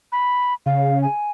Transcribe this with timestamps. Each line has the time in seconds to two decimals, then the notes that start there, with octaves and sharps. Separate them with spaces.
0.12 B5
0.66 C#3 F5
1.02 G#5